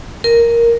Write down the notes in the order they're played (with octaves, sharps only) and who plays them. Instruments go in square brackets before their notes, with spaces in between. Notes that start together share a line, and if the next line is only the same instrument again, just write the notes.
[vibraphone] A#4